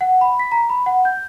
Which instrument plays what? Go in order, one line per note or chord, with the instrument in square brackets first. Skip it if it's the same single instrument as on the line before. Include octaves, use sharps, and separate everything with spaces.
[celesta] F#5
B5
B6
A#5
B5
F#5
G6